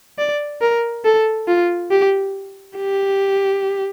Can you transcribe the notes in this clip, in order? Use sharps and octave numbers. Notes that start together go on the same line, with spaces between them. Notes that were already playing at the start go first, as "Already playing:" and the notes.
D5
A#4
A4
F4
G4
G4